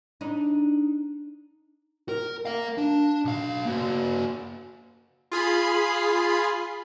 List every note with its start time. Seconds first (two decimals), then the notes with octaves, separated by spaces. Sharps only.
0.21 D4 D#4
2.09 A#4
2.45 A#4 F5
2.78 D4
3.25 B1 F5
3.65 A#3 F#4
5.31 F4 G#4 B5 C7